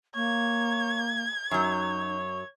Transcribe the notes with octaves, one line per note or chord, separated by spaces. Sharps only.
A#3 C#5 G#6
F#2 F#3 D#4 C#5